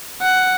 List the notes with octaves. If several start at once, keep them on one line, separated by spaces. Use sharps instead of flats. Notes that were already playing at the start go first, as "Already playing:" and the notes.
F#5